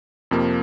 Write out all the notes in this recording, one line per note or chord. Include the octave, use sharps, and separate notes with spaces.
F2 C3 F3 A#3